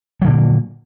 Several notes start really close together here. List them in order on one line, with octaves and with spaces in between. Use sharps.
F#3 D3 A#2 A#3